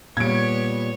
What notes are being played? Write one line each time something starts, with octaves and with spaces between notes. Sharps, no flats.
A#2 G3 B3 B4 C#5 G#6 D7